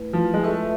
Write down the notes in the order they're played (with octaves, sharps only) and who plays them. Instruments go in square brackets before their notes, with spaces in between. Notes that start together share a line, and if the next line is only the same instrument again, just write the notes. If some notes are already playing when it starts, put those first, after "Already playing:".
Already playing: [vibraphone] A3 E4 B4
[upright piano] F3
G#3
[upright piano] A3 [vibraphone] F4 B4 E5